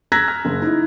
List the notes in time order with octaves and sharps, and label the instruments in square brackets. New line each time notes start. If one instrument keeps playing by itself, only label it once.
[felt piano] A#5 E6 F#6 G#6 A#6 B6
F6
F#1
D#4 E4